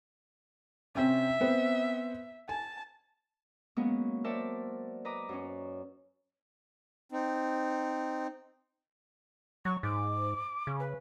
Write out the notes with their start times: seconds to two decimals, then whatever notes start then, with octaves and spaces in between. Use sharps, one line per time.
0.95 C3 C4 C#4 E5
1.41 B3 C4 C5
2.49 G#5 A5
3.77 F#3 G#3 A#3 B3 C#4
4.24 A#4 C5 D5 E5 F#5 A5
5.05 B4 D#5 A#5 D6 D#6
5.29 F#2 C#4
7.12 C4 D#4
9.65 F#3 C#6
9.83 G#2 D6
10.67 C#3
10.80 B4